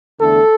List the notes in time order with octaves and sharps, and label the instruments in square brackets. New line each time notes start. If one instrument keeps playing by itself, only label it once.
[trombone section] E2 D3 A3 A4